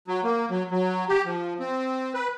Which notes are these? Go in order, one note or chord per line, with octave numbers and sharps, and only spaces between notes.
F#3
A#3
F#3
F#3
G4
F3
C4
B4